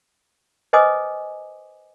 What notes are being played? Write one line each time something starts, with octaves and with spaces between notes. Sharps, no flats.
B4 C5 D#5 G#5 D6 D#6